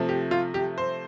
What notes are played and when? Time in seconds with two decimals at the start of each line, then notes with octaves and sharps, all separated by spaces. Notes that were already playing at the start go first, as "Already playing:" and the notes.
Already playing: C3 F3 A3
0.09 G4
0.31 F4
0.54 G4
0.78 C5